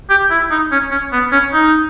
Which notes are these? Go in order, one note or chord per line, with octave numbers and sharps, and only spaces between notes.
G4
E4
D#4
C#4
C#4
B3
C#4
D#4